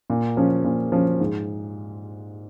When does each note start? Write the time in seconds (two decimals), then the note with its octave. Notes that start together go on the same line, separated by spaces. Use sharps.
0.10 A#2
0.37 F3 C#4
0.64 A#2
0.92 F3 C#4
1.20 G#2